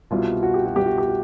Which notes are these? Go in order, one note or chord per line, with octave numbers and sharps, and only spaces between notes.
C2 B2 F4
F#4
G4
F#4
C2 B2 G4
F#4
G4
F#4